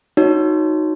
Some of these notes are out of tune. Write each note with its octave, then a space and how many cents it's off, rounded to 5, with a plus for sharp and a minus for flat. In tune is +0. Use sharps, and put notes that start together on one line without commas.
D#4 +0 F#4 -10 C#5 +0